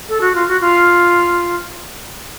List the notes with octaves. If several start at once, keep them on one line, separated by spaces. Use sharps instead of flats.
A4
F#4
F4
F#4
F4